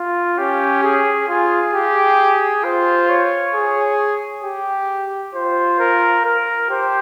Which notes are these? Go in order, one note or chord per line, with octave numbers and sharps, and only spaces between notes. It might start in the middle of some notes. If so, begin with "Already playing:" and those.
Already playing: F4
C#4 G4
G#4
F4 G#4
G4
F4 C5
C#5
G#4
G4
F4 C5
A#4
A#4
G4 C5